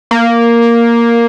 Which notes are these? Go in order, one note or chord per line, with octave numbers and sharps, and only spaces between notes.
A#3